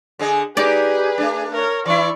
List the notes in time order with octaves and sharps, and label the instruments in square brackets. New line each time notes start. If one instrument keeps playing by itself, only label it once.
[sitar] D3 G#4 D#5
[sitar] D#4 G4 [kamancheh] G#4 B4 [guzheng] D5
[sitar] A3 D4
[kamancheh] A#4 C#5
[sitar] E3 E4 [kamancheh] D5 C#6